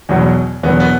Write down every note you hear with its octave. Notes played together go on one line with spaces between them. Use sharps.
E2 B2 F#3
E2 B2 F#3 B3
B3